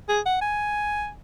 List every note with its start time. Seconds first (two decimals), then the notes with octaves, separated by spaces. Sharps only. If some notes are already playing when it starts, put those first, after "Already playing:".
0.09 G#4
0.26 F#5
0.41 G#5